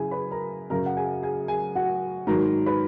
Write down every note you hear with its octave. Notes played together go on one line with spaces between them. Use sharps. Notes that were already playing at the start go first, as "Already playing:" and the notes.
Already playing: F#2 C#3 E4 G#4 G#5
B4 B5
A#4 A#5
F#2 C#3 F#3 A#4 A#5
F#5
G#4 G#5
G#4 G#5
G#4 G#5
F#4 F#5
G#2 D#3 F#3 A#4 A#5
B4 B5